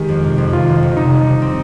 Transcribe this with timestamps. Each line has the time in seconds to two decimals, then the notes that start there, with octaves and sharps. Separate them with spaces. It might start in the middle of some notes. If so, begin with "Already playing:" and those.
Already playing: D#3 G#3 G4
0.09 F2
0.23 C3
0.38 F2
0.53 D#3 F4
0.68 F2
0.83 C3
0.97 C3 D#4
1.12 G3
1.27 C3
1.42 C4